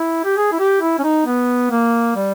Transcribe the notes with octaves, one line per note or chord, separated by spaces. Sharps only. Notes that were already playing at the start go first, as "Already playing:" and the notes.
Already playing: E4
G4
G#4
E4
G4
E4
C#4
D#4
B3
A#3
G3